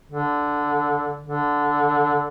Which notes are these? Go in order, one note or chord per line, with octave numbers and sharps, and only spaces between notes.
D3
D3